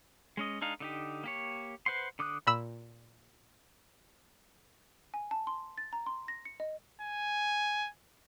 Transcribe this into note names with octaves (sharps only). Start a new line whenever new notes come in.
G#3 C#4 D#5
G#3 D4 D#4 F5
D3 D#4 G4
A#3 G4 C#5
B4 C5 F#5 C6
D3 D6 D#6 F#6
A#2 B5 E6
G#5
A5
C6
A6
A#5
C6
A#6
C#7
D#5
G#5